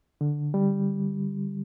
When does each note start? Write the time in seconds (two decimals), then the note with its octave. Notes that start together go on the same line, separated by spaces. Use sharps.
0.21 D3
0.54 G3